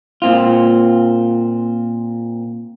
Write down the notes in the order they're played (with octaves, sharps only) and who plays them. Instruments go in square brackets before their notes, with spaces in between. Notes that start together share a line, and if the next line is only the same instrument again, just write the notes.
[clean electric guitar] A#2 C4 F4